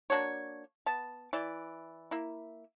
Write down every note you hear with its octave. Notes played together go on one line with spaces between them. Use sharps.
A#3 D4 F#4 C#5
B3 A5
E3 D5
A#3 E4